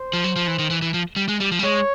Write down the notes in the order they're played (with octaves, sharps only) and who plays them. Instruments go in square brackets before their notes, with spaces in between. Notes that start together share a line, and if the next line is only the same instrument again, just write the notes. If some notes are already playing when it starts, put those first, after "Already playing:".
Already playing: [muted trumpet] C5
[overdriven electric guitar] F3
F#3
F3
E3
D#3
E3
E3
F3
G3
G#3
G3
F3
G3
[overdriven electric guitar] G#3 [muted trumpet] C#5